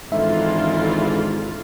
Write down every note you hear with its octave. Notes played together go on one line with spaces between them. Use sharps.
G#1 G#2 D3 E3 F4 E5